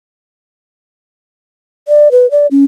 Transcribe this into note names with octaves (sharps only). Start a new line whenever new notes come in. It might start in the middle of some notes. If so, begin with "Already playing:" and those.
D5
B4
D5
C#4